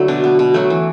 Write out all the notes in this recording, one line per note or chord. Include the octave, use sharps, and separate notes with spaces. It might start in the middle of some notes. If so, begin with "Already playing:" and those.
Already playing: D3 F#3 A3 E4
B2 D4
B3
B2
F#3 A3
E3